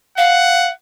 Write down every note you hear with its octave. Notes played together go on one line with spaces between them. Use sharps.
F5 F#5